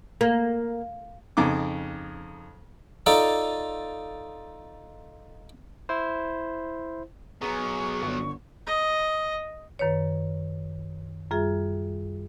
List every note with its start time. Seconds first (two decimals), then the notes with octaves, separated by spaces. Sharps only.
0.21 A#3
1.37 F2 C#3 D#4 D6
3.06 D#4 F4 A4 D5
5.89 E4 C5
7.42 F#3 B3 G#4 A#5 C#6
8.02 G1 D3
8.67 D#5
9.79 F#2 D#3 B4 C#5
11.31 F#2 G3 F4 G#4 E5